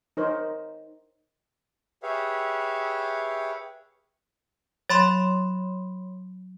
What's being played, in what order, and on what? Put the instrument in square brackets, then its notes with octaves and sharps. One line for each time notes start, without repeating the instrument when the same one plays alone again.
[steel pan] D#4 A#4 C5 C#5
[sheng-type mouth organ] G4 G#4 B4 C#5 E5 F5
[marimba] F#3 [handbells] C#5 B5 C6